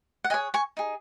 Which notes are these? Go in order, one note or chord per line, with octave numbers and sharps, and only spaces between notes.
F#5
G#4 C#5 D#5 G#5
G#5 C#6
D#4 G#4